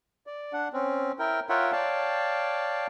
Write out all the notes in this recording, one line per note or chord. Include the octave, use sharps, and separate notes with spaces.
D5
D4 F#5
C4 C#4
E4 A#4 G5
F4 A#4 C#5 E5 F#5 G5
C#5 D5 F5 G5 A5